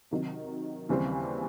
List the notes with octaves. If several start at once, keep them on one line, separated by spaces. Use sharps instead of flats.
C3 D#3 F#3
D#2 C#3 E3 G3 C4